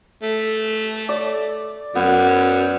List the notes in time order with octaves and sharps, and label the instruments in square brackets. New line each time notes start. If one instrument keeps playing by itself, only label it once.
[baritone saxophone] A3
[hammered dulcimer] D5
[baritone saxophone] F#2 [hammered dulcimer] B3